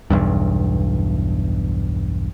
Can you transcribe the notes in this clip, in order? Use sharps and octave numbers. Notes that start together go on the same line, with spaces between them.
B1 E2 G2